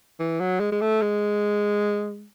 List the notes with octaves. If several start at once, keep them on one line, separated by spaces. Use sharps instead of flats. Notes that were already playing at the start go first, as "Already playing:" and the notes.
E3
F#3
G#3
G#3
A3
G#3